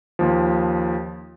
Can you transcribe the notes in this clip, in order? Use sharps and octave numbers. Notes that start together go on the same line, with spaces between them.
D#2 F3